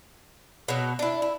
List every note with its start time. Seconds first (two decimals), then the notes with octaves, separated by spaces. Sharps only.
0.68 B2 F#3
0.99 D4 E4
1.22 E4